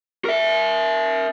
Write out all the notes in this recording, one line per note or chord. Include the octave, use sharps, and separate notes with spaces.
A#4 E5